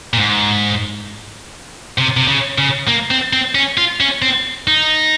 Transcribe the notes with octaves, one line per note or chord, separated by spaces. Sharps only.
A#2
G#2
C3
C3
C#3
C#3
A#3
C4
C4
C#4
F4
C#4
C4
D#4